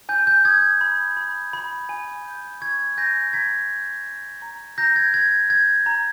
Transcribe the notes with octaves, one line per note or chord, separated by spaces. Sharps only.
G#5 G6
G6
D#6 G#6
B5
B5
B5
G#5
G6
C#6 G#6
G#5 G6 A#6
A#5 G#6 B6
G6
G6
A#5
A#5 G6 A#6
G#6
G6 G#6
G6 G#6
A#5